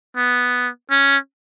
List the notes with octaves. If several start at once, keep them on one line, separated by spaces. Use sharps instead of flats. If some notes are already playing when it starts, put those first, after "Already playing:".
B3
C#4